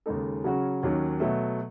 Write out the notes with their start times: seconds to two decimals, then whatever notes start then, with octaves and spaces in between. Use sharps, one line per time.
0.06 D#2 C#3 G#3 D#4 A4
0.44 C#3 F#3 C#4 F#4
0.83 D#2 D#3 F#3 C#4
1.20 B2 F#3 A3